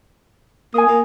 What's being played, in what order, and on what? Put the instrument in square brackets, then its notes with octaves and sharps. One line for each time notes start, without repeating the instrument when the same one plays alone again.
[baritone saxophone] A#3 [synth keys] G#5 D#6
[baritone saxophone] A#3